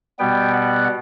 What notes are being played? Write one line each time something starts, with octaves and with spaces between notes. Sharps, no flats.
B2 G3 B3 G5
F#5